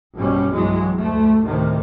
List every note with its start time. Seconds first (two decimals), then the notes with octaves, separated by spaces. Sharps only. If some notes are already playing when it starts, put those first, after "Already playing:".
0.16 A#1 G2 B2 G3 C#4
0.52 B1 G2 E3 F#3 G#3
0.98 D2 A3
1.43 D2 A2 C3 D#3